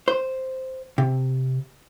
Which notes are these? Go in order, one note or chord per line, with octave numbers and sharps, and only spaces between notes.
C5
C3